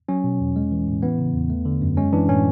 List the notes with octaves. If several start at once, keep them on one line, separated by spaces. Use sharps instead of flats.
F#3 C#4
B2
E2
G#3
E3
A2
E3 B3
C#3
E2
A3
D3
F#2
G#3 C#4
E3 D4
A2 C#4